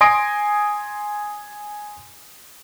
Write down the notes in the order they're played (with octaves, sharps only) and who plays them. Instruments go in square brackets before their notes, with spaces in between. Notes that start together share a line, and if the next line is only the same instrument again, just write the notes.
[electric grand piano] G#5 C6 D#6 A#6 D7